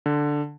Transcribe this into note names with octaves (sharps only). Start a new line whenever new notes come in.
D3